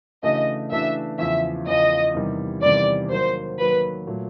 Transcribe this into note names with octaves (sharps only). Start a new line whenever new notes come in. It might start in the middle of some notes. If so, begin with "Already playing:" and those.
C#3 E3 A3 D4 F#4 D#5
C#3 E3 A3 D4 F#4 E5
E2 C#3 F3 E5
E2 C#3 F3 D#5
E2 C3 D#3 G3
E2 C3 D#3 G3 D5
D#3 F#3 A#3 C5
D#3 F#3 A#3 B4
A#2 F#3 A3